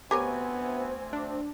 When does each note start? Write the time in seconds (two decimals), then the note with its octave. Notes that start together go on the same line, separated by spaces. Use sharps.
0.11 D2 B3 C4 G4 A#4 C#5 G#5
1.13 D4